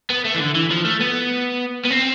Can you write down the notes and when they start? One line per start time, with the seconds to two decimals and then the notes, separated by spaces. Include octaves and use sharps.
0.10 B3
0.25 A3
0.35 E3
0.40 D3
0.55 E3
0.71 F3
0.85 A3
1.01 B3
1.85 B3
1.90 C4